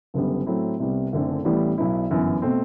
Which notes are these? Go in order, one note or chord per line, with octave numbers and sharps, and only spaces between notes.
F#1 F#2 D3 G3 B3
A2 F#3 A3 C4 E4
C2 C3 G3 B3
F#1 F#2 D3 A3 C4
A1 A2 E3 G3 B3
B1 B2 F#3 B3 E4
G1 F#2 E3 B3
B2 A3 C4